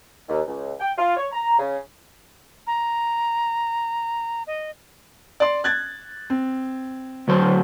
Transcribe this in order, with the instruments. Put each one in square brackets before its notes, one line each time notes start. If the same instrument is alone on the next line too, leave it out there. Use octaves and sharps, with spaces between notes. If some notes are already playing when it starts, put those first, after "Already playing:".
[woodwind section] D#2
C#2
G5
F4
C#5
A#5
C#3
[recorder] A#5
D#5
[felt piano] D5 C6
F#6 G#6 A6
C4
[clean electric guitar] D2 F#3 C5